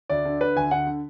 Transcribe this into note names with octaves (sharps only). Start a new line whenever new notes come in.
D2 D5
D3
D3 B4
D2 G#5
D3 F#5
D3